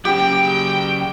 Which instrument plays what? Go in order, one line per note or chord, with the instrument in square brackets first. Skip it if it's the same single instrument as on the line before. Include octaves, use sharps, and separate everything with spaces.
[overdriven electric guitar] C#3 F#3 [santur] G4 [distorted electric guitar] G5